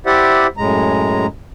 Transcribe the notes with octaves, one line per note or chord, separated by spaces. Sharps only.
E4 G4 C5 D5 E5 F#5
F#2 A2 G#3 A#5